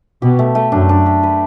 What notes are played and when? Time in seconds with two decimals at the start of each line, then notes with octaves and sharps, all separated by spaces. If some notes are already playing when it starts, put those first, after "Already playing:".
0.22 B2 G4
0.39 A3
0.55 A3
0.72 F#2 D4
0.89 D4
1.06 G4
1.23 B4